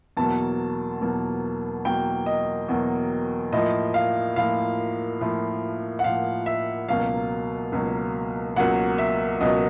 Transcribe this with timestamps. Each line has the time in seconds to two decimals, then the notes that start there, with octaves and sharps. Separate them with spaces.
0.17 E2 B2 F#3 A#3 A5
1.01 E2 B2 F#3 A#3
1.85 E2 B2 F#3 A#3 G5
2.26 D#5
2.69 E2 B2 F#3 A#3
3.52 A2 F3 A#3 D#5
3.94 F5
4.36 A2 F3 A#3 F5
5.21 A2 F3 A#3
5.99 F#5
6.04 A2 F3 A#3 F5
6.46 E5
6.89 C#2 B2 F#3 A#3 F5
7.72 C#2 B2 F#3 A#3
8.56 C#2 B2 F#3 A#3 F#5
8.98 E5
9.40 C#2 B2 F#3 A#3 D#5